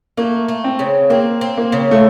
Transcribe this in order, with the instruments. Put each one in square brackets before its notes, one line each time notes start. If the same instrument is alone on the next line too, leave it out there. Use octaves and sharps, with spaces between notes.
[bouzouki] A3 [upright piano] A#3
[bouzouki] A3
[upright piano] C4
[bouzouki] C#3
[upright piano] A#3 [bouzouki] C4
[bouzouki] C4
[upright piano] A#3
[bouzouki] C#3
[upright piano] A3